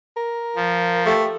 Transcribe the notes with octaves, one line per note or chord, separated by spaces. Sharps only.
A#4
F3
A3 G4